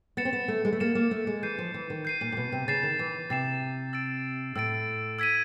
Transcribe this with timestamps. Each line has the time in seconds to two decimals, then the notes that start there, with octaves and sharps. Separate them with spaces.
0.17 B3 A6 C#7 E7
0.25 C4
0.33 B3
0.48 A3
0.65 G#3
0.73 A3
0.80 A#3 A6 C#7 E7
0.95 A#3
1.11 A3
1.27 G#3
1.43 E3 G6 C7 D#7
1.58 F3
1.74 E3
1.90 D#3
2.05 G6 C7 D#7
2.21 A#2
2.32 A#2
2.37 B2
2.52 C3
2.68 C#3 A6 C7 E7
2.83 D#3
2.99 E3
3.30 C3 A6 C7 E7
3.93 E6 A6 D7
4.56 A2 E6 A6 D7
5.19 E6 G#6 B6 D#7